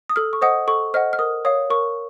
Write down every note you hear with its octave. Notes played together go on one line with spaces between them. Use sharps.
D#6
A4 F6
C#6
C5 D#5 F#5 D#6
A4 C#6
C5 D#5 F#5 F6
F6
A#4 D#6
C#5 F5 D#6
A#4 C#6